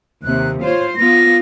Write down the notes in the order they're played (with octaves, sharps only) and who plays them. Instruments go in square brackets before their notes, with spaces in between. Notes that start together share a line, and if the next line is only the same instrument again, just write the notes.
[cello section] D#2 C3 [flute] F#6
[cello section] F4 C5 [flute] C#5
[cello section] B3 F4 [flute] A#6